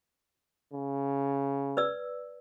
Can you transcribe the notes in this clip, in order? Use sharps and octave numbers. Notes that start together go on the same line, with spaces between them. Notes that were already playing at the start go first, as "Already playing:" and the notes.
C#3
B4 D5 E6